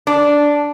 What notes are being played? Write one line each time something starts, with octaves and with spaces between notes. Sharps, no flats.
D4